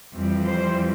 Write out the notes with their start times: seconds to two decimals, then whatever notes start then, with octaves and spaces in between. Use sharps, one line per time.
0.13 F2 E3 G3
0.45 C5